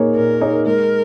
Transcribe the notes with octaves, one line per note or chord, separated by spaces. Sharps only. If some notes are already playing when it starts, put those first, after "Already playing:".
Already playing: A#2 A#3 D#4 G#4 C#5
A#2 A#4
A#3 D#4 G#4 C#5
G#3 A#4